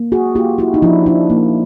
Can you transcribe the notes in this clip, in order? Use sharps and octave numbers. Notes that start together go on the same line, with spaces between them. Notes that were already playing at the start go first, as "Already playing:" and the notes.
Already playing: A#3
F#4 G#4
A#3 F4 G4
E4 F#4
D#4
F3 D4 E4
D4 E4
A#3